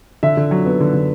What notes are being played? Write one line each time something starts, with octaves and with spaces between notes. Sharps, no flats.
D3 E5
D3
F#3
B3
D3
D3